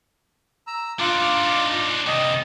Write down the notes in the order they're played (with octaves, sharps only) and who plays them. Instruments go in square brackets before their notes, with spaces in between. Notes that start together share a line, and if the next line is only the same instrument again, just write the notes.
[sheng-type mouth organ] A#5 E6
[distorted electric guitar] D4 D#4 [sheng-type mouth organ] F4 D6
[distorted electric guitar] C2 D#3 [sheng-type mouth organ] D#5 D#6